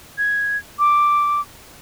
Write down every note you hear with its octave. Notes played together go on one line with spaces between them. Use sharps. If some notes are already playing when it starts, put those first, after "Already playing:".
G#6
D6